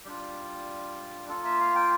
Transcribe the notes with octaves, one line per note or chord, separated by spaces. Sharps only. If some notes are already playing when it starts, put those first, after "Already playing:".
G3 D4 F4 G4
A#3 F4 A4
E5
F5
G5